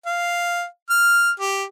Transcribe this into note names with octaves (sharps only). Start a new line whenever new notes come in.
F5
F6
G4